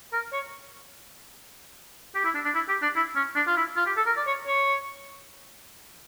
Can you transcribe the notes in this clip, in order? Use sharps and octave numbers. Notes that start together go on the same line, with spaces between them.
A#4
C#5
G4
E4
D4
D4
E4
G4
D4
E4
C#4
D4
F4
E4
F4
G4
A4
A#4
D5
C#5
C#5